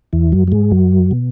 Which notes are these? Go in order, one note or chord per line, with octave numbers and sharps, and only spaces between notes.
E2 E3
F#2 F#3
F#3
G#2 G#3
F#2 F#3
B2